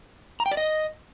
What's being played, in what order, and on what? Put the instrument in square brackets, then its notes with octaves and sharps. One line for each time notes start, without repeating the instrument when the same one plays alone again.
[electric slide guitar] A#5
G5
D5
D#5